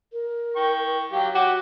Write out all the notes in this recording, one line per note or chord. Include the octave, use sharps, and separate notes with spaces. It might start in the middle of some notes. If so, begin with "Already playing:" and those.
A#4
G5 C#6
F#3 G4 F5
F#4 F#5 G5 D6